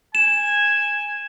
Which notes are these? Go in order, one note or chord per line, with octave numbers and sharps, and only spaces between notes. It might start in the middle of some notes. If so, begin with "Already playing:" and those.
G#5 E7